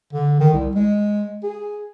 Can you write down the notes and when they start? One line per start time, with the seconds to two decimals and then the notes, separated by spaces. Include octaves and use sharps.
0.13 D3
0.40 D#3
0.53 C2
0.75 G#3
1.43 G#4